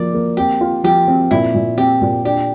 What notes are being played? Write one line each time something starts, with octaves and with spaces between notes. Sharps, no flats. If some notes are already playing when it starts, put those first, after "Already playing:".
Already playing: F3 A#3 D5
A#3
C4 G4
F4
F3 G4
C4
A#2 E4
A#2
C4 G4
A#2
D4 G4